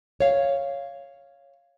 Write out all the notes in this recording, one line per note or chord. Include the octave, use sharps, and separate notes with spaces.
C#5 F5